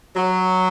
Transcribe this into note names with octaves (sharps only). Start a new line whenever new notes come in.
F#3